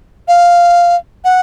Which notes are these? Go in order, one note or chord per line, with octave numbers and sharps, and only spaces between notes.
F5
F#5